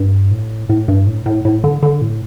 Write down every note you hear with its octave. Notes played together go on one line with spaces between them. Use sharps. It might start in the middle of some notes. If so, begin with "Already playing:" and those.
Already playing: G2
A2
A2
G2
A2
A2
A2
D3
D3
A2